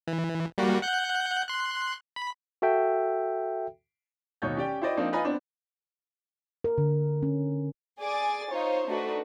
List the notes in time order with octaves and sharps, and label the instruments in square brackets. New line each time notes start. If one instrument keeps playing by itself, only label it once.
[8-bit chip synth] E3
G3 A#3 F#4
F#5 F#6 G6
C6 F#6
B5
[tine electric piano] F#4 A4 E5 G5
[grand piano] D1 D#2 B2 D#4 C#5 G6
C#4 G4 D5 G5
E4 F#4 C5 D5 D#5 G5
F3 A#3 C4 D4 D#4
D#4 F4 B4 D#5 G#5 A#5
B3 C4 D4
[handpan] A#4
D3
C#4
[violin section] G#4 D5 G#5 D6 A6
D#4 F4 C5 C#5
A3 D4 D#4 F#4 A4 B4